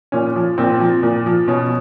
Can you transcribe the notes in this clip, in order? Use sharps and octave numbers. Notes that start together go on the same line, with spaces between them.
A#2 C#4
F3
A#2 C4
F3
A#2
F3
B2 C#4